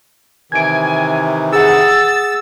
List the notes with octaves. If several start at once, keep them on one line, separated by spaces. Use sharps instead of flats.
C3 D#3 E3 G#5 G#6 D7
G#4 F#5 E6 A6